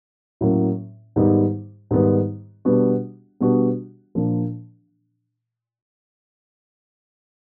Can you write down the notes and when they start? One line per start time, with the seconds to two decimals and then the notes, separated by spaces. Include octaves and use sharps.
0.41 A2 F#3 A#3 C#4
1.16 G#2 D#3 G3 B3 D#4
1.91 G#2 D#3 G3 B3 D#4
2.65 B2 G3 B3 D4 F#4
3.41 B2 G3 B3 D4 F#4
4.15 A#2 F3 A#3 D4